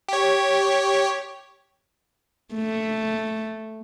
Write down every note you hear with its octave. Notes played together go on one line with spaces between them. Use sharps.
G4 C#5
A3